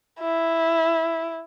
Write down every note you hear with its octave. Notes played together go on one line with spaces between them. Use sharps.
E4